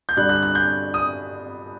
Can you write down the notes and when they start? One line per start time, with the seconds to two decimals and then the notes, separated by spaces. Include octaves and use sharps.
0.09 G6
0.17 G2 D3 F#6
0.29 F#6
0.43 F#6
0.55 G6
0.94 D#6